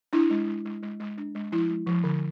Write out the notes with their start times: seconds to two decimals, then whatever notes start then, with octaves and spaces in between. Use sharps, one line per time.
0.13 D4 E4
0.30 G#3
0.48 G#3
0.65 G#3
0.83 G#3
1.00 G#3
1.18 D4
1.35 G#3
1.52 F3 E4
1.70 G#3
1.87 F3
2.04 D3